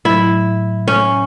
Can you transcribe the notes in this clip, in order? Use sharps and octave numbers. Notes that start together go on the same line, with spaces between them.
A2 F#3 A3 E4
C#4